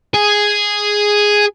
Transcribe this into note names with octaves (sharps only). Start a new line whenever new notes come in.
G#4